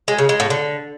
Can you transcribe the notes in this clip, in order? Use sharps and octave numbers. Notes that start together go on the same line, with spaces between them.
G#3
C#3
G#3
A2
D3